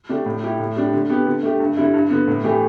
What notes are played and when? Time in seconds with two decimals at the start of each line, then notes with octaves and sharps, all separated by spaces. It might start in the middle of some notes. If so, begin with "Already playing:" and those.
0.09 D3 A3 D4 G4
0.26 A2
0.43 G3 E4 G4
0.60 A2
0.76 G3 D4 G4
0.94 D3
1.10 B3 G4
1.27 D3
1.43 A3 G4
1.60 G2
1.77 D3 G3 E4
1.94 G2
2.10 D3 B3
2.28 A2
2.44 E3 A3 G4